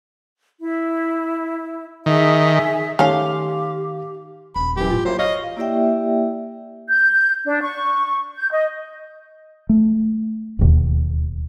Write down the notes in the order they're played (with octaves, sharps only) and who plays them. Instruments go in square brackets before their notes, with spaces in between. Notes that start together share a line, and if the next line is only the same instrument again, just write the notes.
[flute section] E4
[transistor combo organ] D#3 [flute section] G#4 E5
[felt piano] D#3 [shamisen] A3 C#4 [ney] G4 [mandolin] F5 C6
[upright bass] D#1 A#3 [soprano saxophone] B5
[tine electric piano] F#2 E3 [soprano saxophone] G4
[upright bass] A2 G#3 [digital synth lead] F4
[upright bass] E3 [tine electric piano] F#3 A#3 E4 [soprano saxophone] C5
[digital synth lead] C#5 [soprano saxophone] D#5 [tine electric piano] F5 C#6
[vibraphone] A#3 E4 G4 D5 E5 G5
[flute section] G6
D4
C#6
G6
D#5
[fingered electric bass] A3
D1 D#2 B2